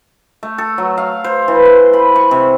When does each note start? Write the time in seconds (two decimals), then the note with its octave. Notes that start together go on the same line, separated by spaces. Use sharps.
0.43 A3
0.58 A4
0.78 F#3
0.98 F5
1.24 C5
1.48 E3
1.65 C6
1.93 B5
2.16 C#6
2.31 C3